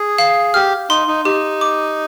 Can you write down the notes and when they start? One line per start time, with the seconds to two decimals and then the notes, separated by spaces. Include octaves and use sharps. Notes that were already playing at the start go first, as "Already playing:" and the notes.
Already playing: G#4
0.18 F5
0.54 G4 F6
0.90 D#4 C6
1.08 D#4
1.25 D#4 G4
1.61 D6